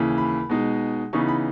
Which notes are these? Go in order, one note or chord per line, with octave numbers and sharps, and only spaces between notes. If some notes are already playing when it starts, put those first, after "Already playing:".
Already playing: D#2 C#3 E3
B5
B2 G#3 D#4
C#3 E3 B3 D#4 C#6
B5